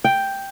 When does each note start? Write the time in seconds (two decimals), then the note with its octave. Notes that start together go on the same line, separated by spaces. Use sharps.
0.04 G5